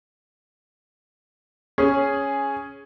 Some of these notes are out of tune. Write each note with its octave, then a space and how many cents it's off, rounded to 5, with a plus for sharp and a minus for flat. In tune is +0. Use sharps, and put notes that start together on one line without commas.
C#4 +0 G#4 +0